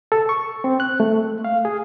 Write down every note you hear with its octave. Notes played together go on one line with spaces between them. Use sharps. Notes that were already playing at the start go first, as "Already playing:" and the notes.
A4
C#6
C4
F#6
A3
F5
G#4